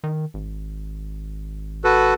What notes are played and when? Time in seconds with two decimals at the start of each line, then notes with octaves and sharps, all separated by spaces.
0.04 D#3
0.34 G#1
1.84 F#4 A4 B4